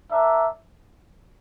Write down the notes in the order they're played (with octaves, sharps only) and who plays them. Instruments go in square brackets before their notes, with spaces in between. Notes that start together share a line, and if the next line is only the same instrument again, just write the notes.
[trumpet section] D4 A#4 E5